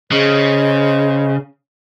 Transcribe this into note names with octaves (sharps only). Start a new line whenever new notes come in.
C#3 G#4 C5 D#5